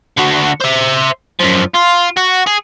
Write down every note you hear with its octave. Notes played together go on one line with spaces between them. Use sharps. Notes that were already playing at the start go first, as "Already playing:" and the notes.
D3 F#4
C5 E5
F#2 F3
F4
F#4
G#4